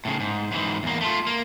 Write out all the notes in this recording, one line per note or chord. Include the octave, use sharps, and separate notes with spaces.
A2 C#3
G#2
G#2 E3
E2 A#3
A3 F4
A#3